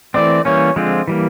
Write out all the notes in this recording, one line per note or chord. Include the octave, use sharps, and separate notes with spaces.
E3 A3 C4 D5
E3 G3 A#3 C#4 C#5
D3 F3 G#3 C4 F4
E3 G3 A#3